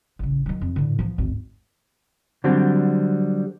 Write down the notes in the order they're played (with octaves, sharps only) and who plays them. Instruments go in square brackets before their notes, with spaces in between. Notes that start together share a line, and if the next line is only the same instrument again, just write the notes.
[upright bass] A1 C#3
D#3 F#3
F2
A2 D3
F3 B3
G#1 D2
[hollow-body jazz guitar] D3 F#3 G3 C4